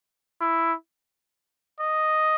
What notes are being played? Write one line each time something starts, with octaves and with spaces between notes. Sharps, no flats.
E4
D#5